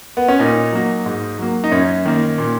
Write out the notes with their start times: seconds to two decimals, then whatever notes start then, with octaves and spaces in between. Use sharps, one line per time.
0.17 B3
0.28 C#4
0.39 A#2 D#4
0.72 F#3 A#3
1.06 G#2
1.38 F#3 A#3
1.64 D#4
1.72 F#2 C#4
2.05 D#3 A#3
2.38 A#2